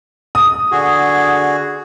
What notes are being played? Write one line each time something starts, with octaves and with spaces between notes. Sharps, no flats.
D#6
D3 F#4 G#4